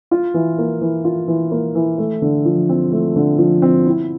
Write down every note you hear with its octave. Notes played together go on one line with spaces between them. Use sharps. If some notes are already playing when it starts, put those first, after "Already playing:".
F4
E3
A#3
E3
F4
E3
A#3
E3
A3
D3
F3
C4
A3
D3
F3
C4
E4